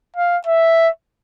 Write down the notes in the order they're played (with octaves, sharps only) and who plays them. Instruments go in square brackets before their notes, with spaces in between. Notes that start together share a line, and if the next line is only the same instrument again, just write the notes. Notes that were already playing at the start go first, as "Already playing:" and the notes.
[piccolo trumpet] F5
E5